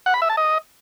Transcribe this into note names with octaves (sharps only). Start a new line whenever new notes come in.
F#5
B5
E5
A5
D#5